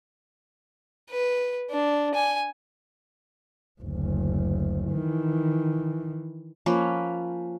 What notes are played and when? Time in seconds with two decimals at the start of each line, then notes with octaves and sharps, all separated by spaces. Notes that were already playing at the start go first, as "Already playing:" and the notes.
1.10 B4
1.71 D4
2.15 G#5
3.81 F#1 D2
4.91 D#3 E3
6.66 F3 A#3 C#4 B4